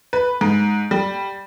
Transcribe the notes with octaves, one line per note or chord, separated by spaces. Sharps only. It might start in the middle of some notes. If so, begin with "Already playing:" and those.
B4
G#2
G3